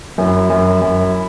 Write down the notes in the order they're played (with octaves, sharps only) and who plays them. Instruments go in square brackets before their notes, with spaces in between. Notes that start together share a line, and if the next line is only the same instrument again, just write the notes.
[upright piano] F#2 [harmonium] E4
[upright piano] F#2
F#2